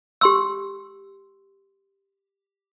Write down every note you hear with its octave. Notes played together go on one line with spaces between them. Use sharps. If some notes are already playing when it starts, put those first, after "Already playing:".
G4 C6 E6